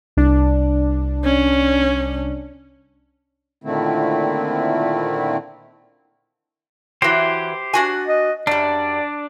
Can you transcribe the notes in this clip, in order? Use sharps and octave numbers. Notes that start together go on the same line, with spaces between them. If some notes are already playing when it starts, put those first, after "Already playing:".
C2 D4
C#4
A#2 D3 D#3 A3 C4 E4
E3 F#3 G4 C5
D4 F#4 G#5
D#5
F#2 G3 D4 D5